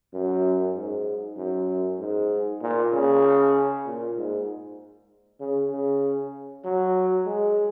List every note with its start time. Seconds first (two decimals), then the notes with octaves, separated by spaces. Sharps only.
0.14 F#2
0.75 G#2
1.37 F#2
1.99 G#2
2.61 A#2
2.92 C#3
3.86 A#2
4.17 G#2
5.40 C#3
5.71 C#3
6.65 F#3
7.26 G#3